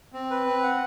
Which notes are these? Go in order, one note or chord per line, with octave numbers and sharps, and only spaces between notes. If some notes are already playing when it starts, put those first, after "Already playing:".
C4
B4
C4
F#5